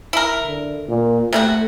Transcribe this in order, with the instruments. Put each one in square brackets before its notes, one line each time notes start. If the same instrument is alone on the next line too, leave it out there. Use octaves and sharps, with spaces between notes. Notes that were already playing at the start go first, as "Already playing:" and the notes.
[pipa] E4 A#4
[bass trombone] D3
A#2
[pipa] C3 E4 F#4 [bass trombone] A3